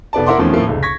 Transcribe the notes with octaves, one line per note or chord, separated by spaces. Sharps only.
F1 B3 D5 A5
E4 A#4 E5 F#5 C6 D6
E2 D#3 F3 A3 C4 C#4
A2 F3 A3 A#3
F1 C#2
C#6 G#6 A#6 B6